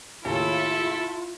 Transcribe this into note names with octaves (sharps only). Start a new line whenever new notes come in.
D#2 A2 C#3 E4 F4 A4